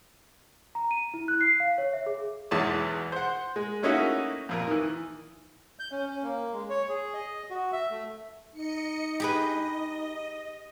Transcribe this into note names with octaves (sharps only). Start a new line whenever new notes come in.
A#5
D#7
E4
F#6
C7
F5
C#5
E5
G#4
B1 E2 G#3 C#5 E5 A5
C5 F#5
G#3
A3 A#3 C#4 D#4 E4 F#4
F2 A#2 A#4
D#3 E3
G6
C#4
C#4
A#3
G#3
C#5
G#4
D#5
F#4
E5
A3
D#4 D#5 C#7
G4 G#4 B4 D#5